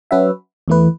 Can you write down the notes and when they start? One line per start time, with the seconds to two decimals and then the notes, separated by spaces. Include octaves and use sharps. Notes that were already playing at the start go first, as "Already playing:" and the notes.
0.11 F#3 C#4 F#4 B4 E5
0.68 E2 E3 A3 E4 B4